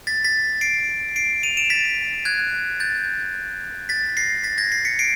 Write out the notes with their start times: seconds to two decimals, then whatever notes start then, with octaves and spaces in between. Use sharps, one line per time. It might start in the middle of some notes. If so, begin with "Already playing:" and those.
0.07 A6 B6
0.24 A6 B6
0.61 C7 D7
1.16 C7 D7
1.43 D#7 F7
1.57 D7 E7
1.70 A6 B6
2.25 F#6 G#6
2.80 G6 A6
3.89 A6 B6
4.17 A#6 C7
4.44 A6 B6
4.58 G#6 A#6
4.72 A#6 C7
4.85 B6 C#7
4.99 C7 D7